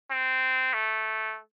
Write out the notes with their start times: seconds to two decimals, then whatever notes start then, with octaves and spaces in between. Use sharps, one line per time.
0.11 C4
0.73 A3